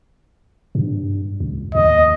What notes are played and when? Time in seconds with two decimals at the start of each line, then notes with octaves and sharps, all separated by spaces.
0.75 G2
1.40 C#2
1.75 D#2 D#5